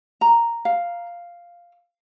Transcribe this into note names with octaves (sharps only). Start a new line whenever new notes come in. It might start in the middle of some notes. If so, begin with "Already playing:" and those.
A#5
F5